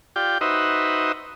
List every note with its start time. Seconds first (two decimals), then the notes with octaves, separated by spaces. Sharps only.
0.16 F4 G4 D5 G5
0.41 D#4 F#4 B4 C5 D#5 E5